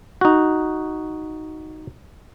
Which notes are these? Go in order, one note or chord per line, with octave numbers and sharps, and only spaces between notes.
D#4 F#4